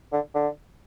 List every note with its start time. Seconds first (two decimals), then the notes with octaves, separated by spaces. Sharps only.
0.13 D3
0.34 D3